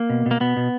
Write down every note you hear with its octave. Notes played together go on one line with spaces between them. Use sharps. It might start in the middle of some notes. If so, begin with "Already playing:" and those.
Already playing: A#3
B2
B2
A#3
B2 B3
B2